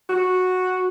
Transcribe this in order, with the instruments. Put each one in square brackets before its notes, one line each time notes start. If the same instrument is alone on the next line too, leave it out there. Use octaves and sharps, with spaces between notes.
[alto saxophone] F#4